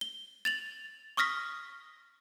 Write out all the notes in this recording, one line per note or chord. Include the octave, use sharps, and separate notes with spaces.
G7
A6 F7 F#7
C#6 D#6 F6 A#6 B6